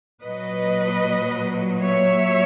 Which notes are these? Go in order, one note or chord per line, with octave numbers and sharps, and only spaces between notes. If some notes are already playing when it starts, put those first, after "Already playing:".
A#2 F#3 B4 D#5
C#5 E5